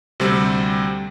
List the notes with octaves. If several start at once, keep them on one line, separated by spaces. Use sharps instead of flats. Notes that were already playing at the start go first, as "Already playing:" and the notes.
D2 C3 G3 C4